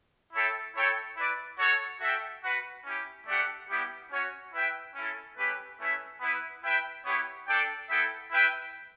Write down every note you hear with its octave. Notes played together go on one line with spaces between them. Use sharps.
E4 A4 C#5 E5 G5
E4 A4 C#5 G5
E4 B4 D5
F#4 A4 C#5
F#4 A4 E5 G5
F#4 B4 F#5
C#4 E4 G4
A3 D4 G4 D5 F#5
G3 B3 E4 G4
C#4 F#4 C#5
E4 B4 E5 G5
C#4 E4 A4
A3 C#4 G4 B4
A3 C#4 E4 B4 E5
B3 E4 B4
E4 B4 E5 G5
B3 E4 G4 C#5
D4 A4 D5 G5
B3 E4 A4 E5 G5
E4 B4 E5 G5